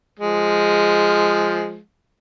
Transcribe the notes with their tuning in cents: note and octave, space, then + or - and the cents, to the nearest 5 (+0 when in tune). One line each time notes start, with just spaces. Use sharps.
F3 +0 G#3 +0